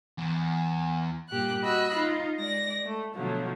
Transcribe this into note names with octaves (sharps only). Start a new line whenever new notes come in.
E2
G2 A#2 G4 F#6
F#4 D#5 B5 E6 F#6
D#4 F4
G#3 D5 A#6
A3
B2 D3 F3 F#3 A3